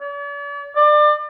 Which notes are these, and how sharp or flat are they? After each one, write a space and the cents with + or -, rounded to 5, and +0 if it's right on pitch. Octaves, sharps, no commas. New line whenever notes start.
D5 -45
D5 +30